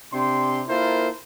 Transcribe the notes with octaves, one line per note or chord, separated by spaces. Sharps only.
C3 D4 G5 C6
A#3 E4 F4 A4 A#4 C5